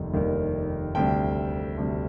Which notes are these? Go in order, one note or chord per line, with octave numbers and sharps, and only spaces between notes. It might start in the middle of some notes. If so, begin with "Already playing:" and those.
Already playing: F1 D#2 D#3 G3
F1 D#2 D#3 G3
D2 C3 G3 G5
D2 C3 G3